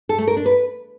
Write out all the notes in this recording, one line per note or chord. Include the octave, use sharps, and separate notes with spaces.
A4
A3
A#4
D4
B4